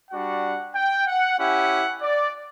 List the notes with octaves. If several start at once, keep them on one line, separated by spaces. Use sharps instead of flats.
G3 D4 F#4 F#5
G5
F#5
C#4 E4 G4 F#5
D5